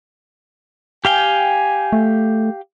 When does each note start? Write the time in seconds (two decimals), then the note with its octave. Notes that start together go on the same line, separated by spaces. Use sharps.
1.05 G4 F5 G5 G#5
1.93 A3